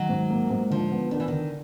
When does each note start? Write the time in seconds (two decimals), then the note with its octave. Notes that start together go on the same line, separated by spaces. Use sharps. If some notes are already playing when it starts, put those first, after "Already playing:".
Already playing: D#3 F#3
0.09 G#2
0.30 A#3
0.50 G#2
0.71 D3 F3
0.92 B3
1.11 D#3 D4
1.20 E3
1.28 D3 D#3